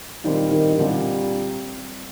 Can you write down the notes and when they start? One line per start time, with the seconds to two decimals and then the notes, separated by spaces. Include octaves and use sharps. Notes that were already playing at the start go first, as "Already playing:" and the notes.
0.23 A#2 D#3 G3 C4
0.51 D#3
0.73 D#3
0.78 A#2 D3 G3 C4